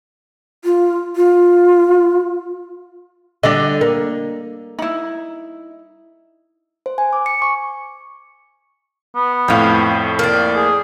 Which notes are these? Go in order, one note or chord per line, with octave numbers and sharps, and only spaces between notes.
F4
F4
D3 G3 D4 D5 D#5
A#3
D#4 E4
C5
G#5
D6
C#7
C#6
B3
F2 A2 F5 G5
A#3 D5
G#4